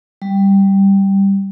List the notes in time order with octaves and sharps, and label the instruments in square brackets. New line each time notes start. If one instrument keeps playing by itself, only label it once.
[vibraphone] G3